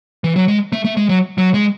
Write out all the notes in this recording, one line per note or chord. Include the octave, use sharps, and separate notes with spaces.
E3
F#3
G#3
A3
A3
G#3
F#3
F#3
G#3